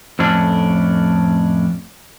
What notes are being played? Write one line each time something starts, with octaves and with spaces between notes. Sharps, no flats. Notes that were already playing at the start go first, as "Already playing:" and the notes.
F2 A2 C#4 D4